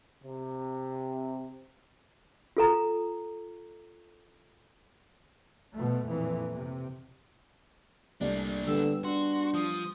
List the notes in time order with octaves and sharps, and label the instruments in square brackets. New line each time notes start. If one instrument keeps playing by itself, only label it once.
[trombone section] C3
[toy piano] F4 A4 A#5
[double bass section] B2 F3 A3
F2 A#2 E3
C3
[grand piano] C2 A3 D5 [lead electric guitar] A#3 D4
[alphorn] D3 [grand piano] G3 B3 [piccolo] E6
[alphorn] D4 [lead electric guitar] F#4 [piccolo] C6
[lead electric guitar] F3 [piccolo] D#6